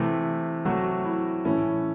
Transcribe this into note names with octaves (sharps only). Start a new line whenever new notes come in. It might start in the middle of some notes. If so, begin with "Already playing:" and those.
Already playing: C3 E3 A3
C3 F#3 A3 F#4
E4
A2 E3 A3 C#4